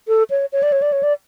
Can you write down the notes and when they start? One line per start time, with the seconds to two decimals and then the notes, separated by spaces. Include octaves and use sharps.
0.08 A4
0.30 C#5
0.53 C#5
0.63 D5
0.72 C#5
0.82 D5
0.92 C#5
1.03 D5